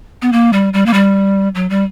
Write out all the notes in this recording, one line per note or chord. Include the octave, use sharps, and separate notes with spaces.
B3
A#3
G3
G3
A#3
G3
F#3
G3